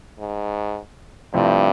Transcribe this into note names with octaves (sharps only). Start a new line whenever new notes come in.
G#2
G2 C3 F3 A3 C4 E4